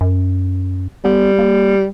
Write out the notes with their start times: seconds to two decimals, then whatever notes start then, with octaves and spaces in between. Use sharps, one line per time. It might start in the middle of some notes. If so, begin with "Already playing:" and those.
0.01 F#2
1.05 G3 B3
1.39 A#3